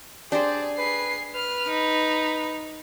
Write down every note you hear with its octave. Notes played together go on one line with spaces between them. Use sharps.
D4 G4 G#4 C5 D5
G#4 B4 C7
B4 F6
D#4